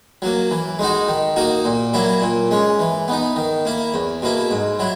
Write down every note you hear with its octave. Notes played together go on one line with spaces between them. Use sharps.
F#3 A#3
E3
G#3 D#4 F#4
D#3
A#3 D#4 F#4
A#2
F#3 A#3 E4
A#2
G#3 C#4
E3
B3 D#4
D#3
A#3 E4
E2
B2 A#3 E4
G#2
F#3 E4